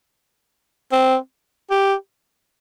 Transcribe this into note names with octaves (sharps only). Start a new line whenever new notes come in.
C4
G4